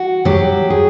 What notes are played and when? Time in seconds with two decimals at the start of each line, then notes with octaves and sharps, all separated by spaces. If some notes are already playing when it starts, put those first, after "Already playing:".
Already playing: F#4
0.25 F#3 G4
0.70 G#4